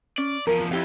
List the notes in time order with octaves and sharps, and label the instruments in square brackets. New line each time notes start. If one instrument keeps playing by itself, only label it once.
[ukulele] C#4 [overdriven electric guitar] D5
[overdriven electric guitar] E2 F3 [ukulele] A#4
[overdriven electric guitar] F2 [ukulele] E4 G4 F5